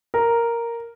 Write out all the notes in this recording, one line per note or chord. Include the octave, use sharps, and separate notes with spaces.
A#4